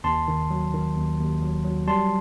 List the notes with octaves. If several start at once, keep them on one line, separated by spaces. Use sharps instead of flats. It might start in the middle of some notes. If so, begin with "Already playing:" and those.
D#2 A5 C6
D#3
F#3
D#3
D#2
D#2
F#3
F#3
G3 A5 C6